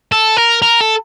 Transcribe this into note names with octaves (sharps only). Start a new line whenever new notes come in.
A4
A#4
A#4
A4